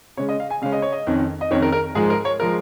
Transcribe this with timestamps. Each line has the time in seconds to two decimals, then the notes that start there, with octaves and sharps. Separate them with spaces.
0.17 C#3 G#3 C#4 C#5
0.29 D#5
0.40 F5
0.50 G#5
0.62 C#3 G#3 C#4 F5
0.72 D#5
0.82 C#5
0.92 D#5
1.07 F2 D#3 C#4
1.41 D#5
1.51 F2 D#3 C#4 C#5
1.62 A#4
1.72 A#4
1.95 G#2 F3 G#3 G#4
2.10 A#4
2.25 C#5
2.40 F3 G#3 A#4